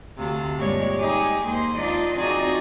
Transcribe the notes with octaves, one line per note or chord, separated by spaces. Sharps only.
D2 C3 F5 A5
G2 A#2 G#3 G4 C#5 D5
D#4 G4 G#4 G#5 D6
D#2 G#3 A#3 C5 C6
D4 D#4 F4 D5 D#5
F3 C4 D#4 F#4 G#4 D5